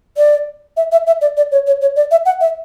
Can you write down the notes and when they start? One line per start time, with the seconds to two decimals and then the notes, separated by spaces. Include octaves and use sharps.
0.17 D5
0.77 E5
0.92 E5
1.07 E5
1.21 D5
1.37 D5
1.52 C#5
1.67 C#5
1.81 C#5
1.96 D5
2.11 E5
2.26 F#5
2.41 E5